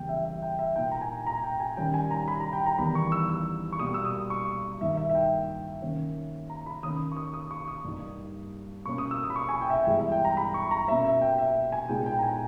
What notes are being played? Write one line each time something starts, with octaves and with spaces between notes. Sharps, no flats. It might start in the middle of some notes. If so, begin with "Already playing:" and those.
Already playing: E2 C#3 G3 A#3 G5
E5
E5
G5
E5
A#2 A#3 D#4 G5
A#5
G#5
A#5
G5
G#5
D#3 G3 C#4 G5
G#5
A#5
B5
A#5
G5
A#5
E2 D#3 G3 B3 B5
C#6
E6
E6
C#6
B2 G3 A#3 D#6
E6
D#6
C#6
G2 D#3 A#3 D#4 E5
E5
E5
G5
D#3 A#3 C#4
A#5
B5
D#3 A#3 C#4 D#6
C#6
D#6
D#6
C#6
D#6
G2 G3 A#3 D#4
B2 A#3 C#4 C#6
D#6
E6
D#6
B5
C#6
G#5
G5
E5
G5
G2 E3 G#3 B3 E5
E5
G5
A#5
B5
C#6
A#5
B2 A#3 C#4 E5
E5
G5
E5
G#5
A#2 G#3 B3 D#4 G5
G5
A#5
G#5